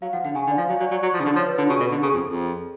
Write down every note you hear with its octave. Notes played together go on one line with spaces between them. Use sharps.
F#3 F5
F3 F#5
D3 F#5
C#3 G#5
D3
D5
F3 F5
F#3 F5
F#3 D5
F#3 D5
F#3
F3
C#3
D3
F3 C#5
B4
D3 F4
C#3 F#4
B2 A4
D3
C#3 G#4
F2
F2 A4